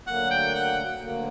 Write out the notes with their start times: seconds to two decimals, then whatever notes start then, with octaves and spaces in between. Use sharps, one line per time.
0.07 D2 D3 F#3 A#3 F#5
0.31 G5
0.55 F#5
1.01 D2 D3 F#3 A#3